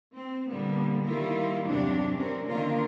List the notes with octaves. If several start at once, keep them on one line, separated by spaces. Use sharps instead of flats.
C4
A#2 D3 G3 A#3 B3
D#3 G3 A#3 E4 F4 A#4
E2 G2 C3 F#3 D4 G4
C4 C#4 A#4
D3 D#3 A#3 F4 A#4